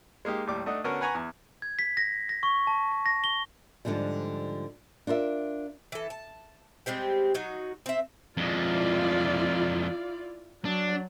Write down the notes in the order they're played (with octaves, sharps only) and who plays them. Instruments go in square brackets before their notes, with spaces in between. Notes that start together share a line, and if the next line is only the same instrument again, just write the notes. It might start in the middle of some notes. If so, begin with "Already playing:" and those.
[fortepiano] G#3 A#3 D#4 G4
D#2 A2 G3 D6
A3 D4 D#4 D#5 F#5
D3 B3 C#4 F#4 A#4 C#6
B4 F#5 G#5 A#5 B5 C#6
E2
[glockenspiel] G#6
B6
A#6
A#6
C#6
A5
A5
A#6
G7
[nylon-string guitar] G#2 D3 E3 F3 G3
D4 F4 A#4 E5
[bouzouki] E3 A4
A5
G3 G#3 C4 G4
F#3 D#4 F#4
C4 E5
[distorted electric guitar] F2 G#3 [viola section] E4 F4 D5
[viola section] F#3 [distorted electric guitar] D4